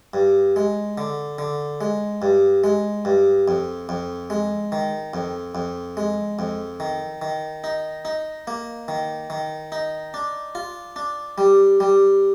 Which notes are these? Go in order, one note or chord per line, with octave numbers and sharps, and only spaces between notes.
G2
G#3
D3
D3
G#3
G2
G#3
G2
F2
F2
G#3
D#3
F2
F2
G#3
F2
D#3
D#3
D#4
D#4
A#3
D#3
D#3
D#4
D4
F4
D4
G3
G3